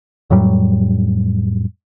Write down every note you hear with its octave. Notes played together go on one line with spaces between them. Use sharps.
F2 A2 F#3 G3